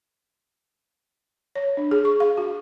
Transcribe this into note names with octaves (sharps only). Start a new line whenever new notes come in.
C#5
D4
G#4
C#6
F5
F#4